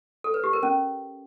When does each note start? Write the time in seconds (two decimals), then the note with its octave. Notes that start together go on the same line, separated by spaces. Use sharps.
0.24 A4
0.34 B4
0.44 G4
0.53 A#4
0.63 C#4